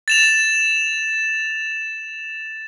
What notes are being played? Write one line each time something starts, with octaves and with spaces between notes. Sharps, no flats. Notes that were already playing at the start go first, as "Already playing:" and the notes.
A6 E7 F7